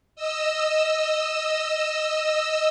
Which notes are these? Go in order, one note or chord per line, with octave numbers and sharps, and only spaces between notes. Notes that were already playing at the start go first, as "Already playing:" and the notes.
D#5 E6